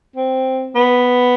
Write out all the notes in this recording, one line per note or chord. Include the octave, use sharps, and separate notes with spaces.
C4
B3